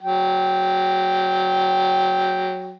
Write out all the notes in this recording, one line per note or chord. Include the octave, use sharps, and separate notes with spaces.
F#3 G5